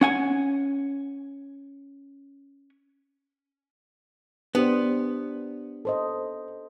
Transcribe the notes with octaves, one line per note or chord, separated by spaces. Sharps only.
C#4 F#5 G#5
B3 D4 G4 C5
A4 C5 D#5